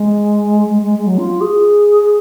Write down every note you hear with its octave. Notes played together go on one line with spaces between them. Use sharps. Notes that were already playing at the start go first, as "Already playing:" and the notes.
Already playing: G#3
G#3
G#3
G#3
F#3
F4
G#4